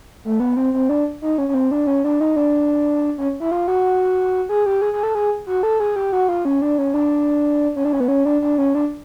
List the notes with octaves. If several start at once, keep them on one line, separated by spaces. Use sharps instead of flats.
A3
B3
C4
C4
D4
D#4
C#4
C#4
C4
D4
C#4
D4
D#4
D4
C#4
E4
F4
F#4
G#4
G4
G#4
G#4
A4
G#4
F#4
A4
G#4
G4
F#4
F4
C#4
D4
C#4
D4
C#4
D4
C#4
B3
C#4
D4
D4
C#4
D4